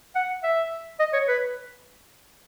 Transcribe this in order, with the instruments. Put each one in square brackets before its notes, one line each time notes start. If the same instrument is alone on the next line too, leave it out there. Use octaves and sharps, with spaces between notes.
[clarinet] F#5
E5
D#5
C#5
B4